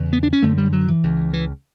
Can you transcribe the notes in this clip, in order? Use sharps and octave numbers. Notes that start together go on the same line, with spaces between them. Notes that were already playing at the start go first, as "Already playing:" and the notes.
Already playing: E2 C#3
B3
D4
C#4
F#2 D3 A3
G3
F#3
E3
C#2 C#3
E3